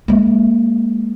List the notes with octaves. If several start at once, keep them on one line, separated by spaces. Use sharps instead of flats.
G#3 A#3